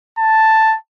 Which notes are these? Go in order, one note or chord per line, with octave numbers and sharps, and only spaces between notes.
A5